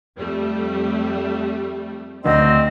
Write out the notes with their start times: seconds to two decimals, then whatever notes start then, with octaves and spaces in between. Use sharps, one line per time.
0.19 F2 G3 A3
2.24 D2 C4 D4 D#5